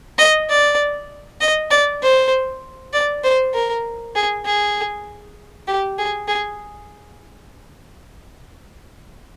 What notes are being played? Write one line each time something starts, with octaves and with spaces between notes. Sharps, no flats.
D#5
D5
D#5
D5
C5
D5
C5
A#4
G#4
G#4
G4
G#4
G#4